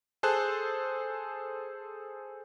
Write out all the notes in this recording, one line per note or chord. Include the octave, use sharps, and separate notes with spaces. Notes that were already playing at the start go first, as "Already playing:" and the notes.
G#4 A4 C5 A5 F#6